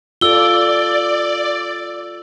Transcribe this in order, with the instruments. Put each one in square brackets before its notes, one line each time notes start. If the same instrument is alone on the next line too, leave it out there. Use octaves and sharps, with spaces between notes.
[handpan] F4 G4 A4 [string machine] D5 [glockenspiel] E6 G7